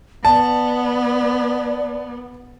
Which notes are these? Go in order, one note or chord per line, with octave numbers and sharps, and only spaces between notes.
B3 D5 A5